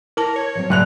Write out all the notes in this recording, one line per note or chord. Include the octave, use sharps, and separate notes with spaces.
E4 A#4 A5
C#5
F3 F#3 C4
F#1 A2 F#3 D5 F#6 F7